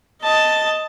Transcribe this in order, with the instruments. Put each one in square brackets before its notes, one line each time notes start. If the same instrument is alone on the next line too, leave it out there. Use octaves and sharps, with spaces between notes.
[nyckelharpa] D#5 A5